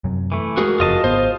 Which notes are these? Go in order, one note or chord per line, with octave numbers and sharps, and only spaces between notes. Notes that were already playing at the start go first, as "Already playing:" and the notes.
F#2 C3 F#3
E3 A3
G#3 F#4 G#4 A#4
F#1 F2 F4 D#5 A5
G#1 B3 C5